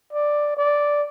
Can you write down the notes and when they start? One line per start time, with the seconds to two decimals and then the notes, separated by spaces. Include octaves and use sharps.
0.13 D5
0.57 D5